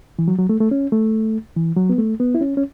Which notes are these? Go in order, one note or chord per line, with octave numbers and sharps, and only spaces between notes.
E3
F#3
F#3
A3
A3
C#4
A3
E3
F#3
B3
A3
B3
E4
C#4
C#4